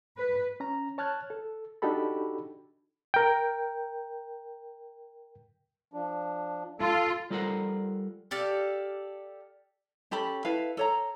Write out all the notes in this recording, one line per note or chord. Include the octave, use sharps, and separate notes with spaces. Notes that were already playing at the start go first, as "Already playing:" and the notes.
B4
C#4 A#5
C#5 A5 F6 F#6 G#6
A4
D4 D#4 F#4 G4 A4 B5
A#4 G5
F3 D4
F4 A4
G3 F4 A4 A#4 C5 F#5
G4 A4 D5 F5
C#4 G4 A4 B5
E4 A4 B4 F5
A4 C#5 A#5